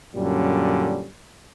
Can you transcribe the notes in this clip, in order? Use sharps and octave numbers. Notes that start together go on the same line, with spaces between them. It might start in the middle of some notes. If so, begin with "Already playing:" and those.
F#2 A#2 D3 G3 C#4